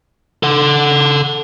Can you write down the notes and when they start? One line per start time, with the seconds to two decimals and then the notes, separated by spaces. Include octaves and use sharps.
0.43 A4 F#5